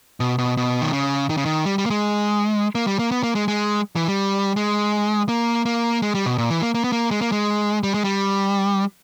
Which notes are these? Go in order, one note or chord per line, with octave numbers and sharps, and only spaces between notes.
B2
B2
B2
D#3
C#3
D#3
C#3
D#3
G3
G3
A#3
G#3
A#3
G3
A#3
B3
A#3
G#3
G#3
E3
G3
G#3
A#3
A#3
G#3
G3
B2
A#2
E3
A#3
A#3
B3
A#3
G#3
A#3
G#3
G3
G#3
G3